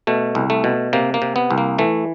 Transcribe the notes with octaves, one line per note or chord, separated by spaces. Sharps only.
B2 A3
C2
A3
B2
C3 A#3
A#3
C3
B3
C2
A#3
E3 A3